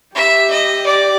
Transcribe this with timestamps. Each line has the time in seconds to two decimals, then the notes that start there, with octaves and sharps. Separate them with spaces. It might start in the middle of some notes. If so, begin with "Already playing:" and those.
0.15 G4 E5
0.50 D#5
0.86 D5